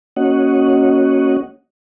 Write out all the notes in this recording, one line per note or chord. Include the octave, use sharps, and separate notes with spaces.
A#3 C#4 F#4 C#5 D#5 F#5